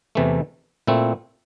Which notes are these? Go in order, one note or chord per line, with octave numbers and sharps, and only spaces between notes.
E2 C3 E3 A3
A#2 A3 C4 E4